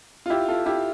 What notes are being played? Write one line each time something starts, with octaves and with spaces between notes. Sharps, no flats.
F4
E4 G4
F4 A4
E4 G4